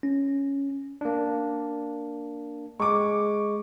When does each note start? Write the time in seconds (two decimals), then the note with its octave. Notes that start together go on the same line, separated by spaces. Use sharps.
0.03 C#4
1.01 A#3 D4
2.80 G#3 C#6 D6